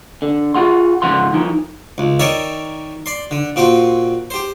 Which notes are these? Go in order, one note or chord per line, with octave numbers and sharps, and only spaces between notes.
D3
F4 G#4 F#5 C6
G#2 C#3 F3 F#5 C6
F3 D#4 E4
C#2
D#3 A#4 C#5 D5 E5
D5 C6
D3
A#2 C4 F#4
G4 C5